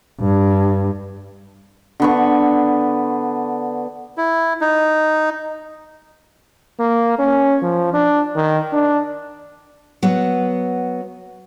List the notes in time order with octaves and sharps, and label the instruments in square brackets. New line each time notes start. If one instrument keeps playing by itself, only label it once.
[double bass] G2
[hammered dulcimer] D3 B3 C#6
[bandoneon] E4
D#4
[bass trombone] A#3
C#4
F3
D4
D#3
D4
[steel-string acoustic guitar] F#3 B3